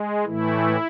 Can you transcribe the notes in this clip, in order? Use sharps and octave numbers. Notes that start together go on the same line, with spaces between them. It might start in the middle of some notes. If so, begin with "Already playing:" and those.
Already playing: G#3
A2 E3 A3 E4